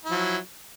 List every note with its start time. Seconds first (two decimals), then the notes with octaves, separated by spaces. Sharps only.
0.05 E4
0.08 F3
0.11 F#3